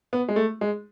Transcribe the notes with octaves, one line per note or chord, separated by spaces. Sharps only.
B3
G#3
A3
G#3